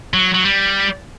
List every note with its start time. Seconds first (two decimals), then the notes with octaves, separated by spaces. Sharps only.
0.14 F#3
0.34 F#3
0.44 G3